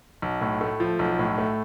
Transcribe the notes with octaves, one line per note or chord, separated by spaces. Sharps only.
B1
A2
A3
F3
B1
A2
A3